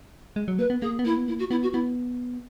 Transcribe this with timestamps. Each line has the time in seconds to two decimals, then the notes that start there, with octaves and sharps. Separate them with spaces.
0.36 G#3
0.48 F#3
0.59 A#3 B4
0.70 B3
0.82 A#3 G#4
0.99 B3
1.04 A#3 E4
1.17 B3
1.28 A#3 E4
1.39 F#4
1.50 B3 E4
1.62 F#4
1.73 B3 E4